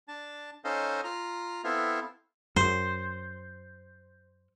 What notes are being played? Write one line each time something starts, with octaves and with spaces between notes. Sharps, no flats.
D4 A5
C#4 D#4 A4 C5 D#5 F5
F4 A#5
B3 C4 E4 A4 F5
F#2 C5